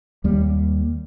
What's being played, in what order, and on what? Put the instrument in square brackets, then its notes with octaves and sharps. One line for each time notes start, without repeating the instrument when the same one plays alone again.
[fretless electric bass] D#2 G3 A#3